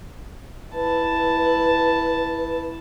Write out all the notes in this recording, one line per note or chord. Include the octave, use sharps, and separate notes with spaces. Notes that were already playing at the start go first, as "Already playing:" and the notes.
E4 B4 A5